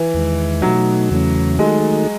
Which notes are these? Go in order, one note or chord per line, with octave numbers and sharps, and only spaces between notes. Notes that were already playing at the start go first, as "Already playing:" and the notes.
Already playing: E3
E2 D#3 G#3
B2 F#3 A3 D#4
E2 C#3 E3 A3 C#4
D#3 G#3 A3 D#4 F#4 A4